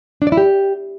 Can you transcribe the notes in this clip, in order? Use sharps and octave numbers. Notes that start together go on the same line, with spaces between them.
D4
D5
E4
G4